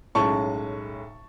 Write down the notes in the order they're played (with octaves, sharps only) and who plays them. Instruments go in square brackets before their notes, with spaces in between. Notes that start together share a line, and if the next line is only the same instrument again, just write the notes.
[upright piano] B1 A2 G#3 C#4 A5 C#6